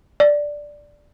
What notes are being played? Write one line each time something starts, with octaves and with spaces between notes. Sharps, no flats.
D5